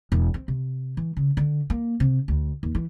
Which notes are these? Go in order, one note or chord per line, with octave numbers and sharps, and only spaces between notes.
E1
C4
C3
E3
C#3
D3
A#3
C3
D2
D#2
E3